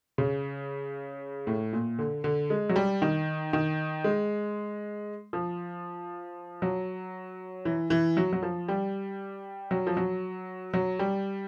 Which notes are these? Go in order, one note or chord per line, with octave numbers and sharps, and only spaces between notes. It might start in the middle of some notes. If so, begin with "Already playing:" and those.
C#3
A2
A#2
D3
D3
G#3
F#3
G3
D#3
D#3
G#3
F3
F#3
E3
E3
F#3
F#3
F3
G3
F#3
F3
F#3
F#3
G3